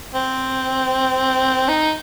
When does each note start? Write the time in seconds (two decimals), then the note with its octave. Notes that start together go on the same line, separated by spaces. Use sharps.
0.14 C4
1.68 D#4